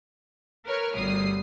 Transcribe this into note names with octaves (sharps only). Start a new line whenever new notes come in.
A#4 B4 C#5 F6
G1 D2 G3 D#6 C7